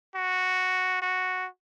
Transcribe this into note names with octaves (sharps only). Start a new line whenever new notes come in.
F#4
F#4